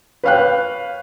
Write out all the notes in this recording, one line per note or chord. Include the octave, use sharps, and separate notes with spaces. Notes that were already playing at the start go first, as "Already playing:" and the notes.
B4 C#5 F5 G5 F#6